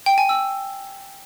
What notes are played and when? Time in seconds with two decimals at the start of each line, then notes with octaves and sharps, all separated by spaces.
0.06 G5
0.18 G#5
0.29 E6